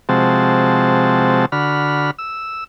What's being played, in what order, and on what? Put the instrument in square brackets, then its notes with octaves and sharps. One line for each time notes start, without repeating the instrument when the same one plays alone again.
[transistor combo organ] C3 F3 G#3 C4 F#4 A5
D3 F#4 B5 F6
E6